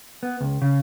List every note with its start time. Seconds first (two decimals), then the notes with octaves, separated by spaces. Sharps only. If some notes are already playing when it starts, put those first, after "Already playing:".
0.23 B3
0.41 C#2
0.62 C#3